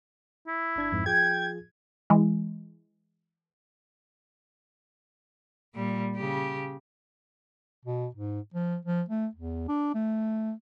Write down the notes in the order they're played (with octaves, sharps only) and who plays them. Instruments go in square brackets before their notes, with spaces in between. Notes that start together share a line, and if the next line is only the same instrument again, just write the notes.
[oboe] E4
[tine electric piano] G1 D4 G#6
F2 G#2
[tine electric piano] F3 F4 G#4 [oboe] G5 [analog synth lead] G#6
[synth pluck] E3 G#3
[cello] A#2 G3
C#3 G4
[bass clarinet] B2
G#2
F3
F3
A3
E2
D4
A3